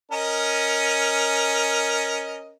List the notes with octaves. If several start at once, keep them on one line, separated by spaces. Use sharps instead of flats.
C#4 A#4 D#5